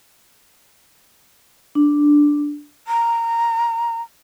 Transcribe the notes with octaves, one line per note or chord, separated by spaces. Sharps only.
D4
A#5